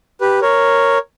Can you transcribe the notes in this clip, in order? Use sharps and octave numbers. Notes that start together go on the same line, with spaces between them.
G4 B4
A#4 C#5